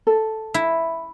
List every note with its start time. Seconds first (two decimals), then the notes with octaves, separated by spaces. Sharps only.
0.07 A4
0.54 E4